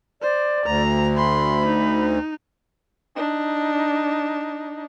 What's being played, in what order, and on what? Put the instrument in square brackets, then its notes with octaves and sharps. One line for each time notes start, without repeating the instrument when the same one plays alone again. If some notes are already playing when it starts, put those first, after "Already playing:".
[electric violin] C5 [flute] D5
[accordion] D2 [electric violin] A#5
[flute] B5 [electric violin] C6
[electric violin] D#4
[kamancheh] D4 D#4